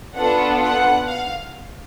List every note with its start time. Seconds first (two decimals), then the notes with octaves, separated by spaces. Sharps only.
0.15 B3 D4 F4 A4 F#5
0.61 F#5
1.07 F5